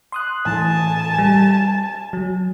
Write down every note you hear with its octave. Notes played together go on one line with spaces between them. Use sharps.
C6 D#6 F#6
A2 E3 G#5 A5
G3
F#3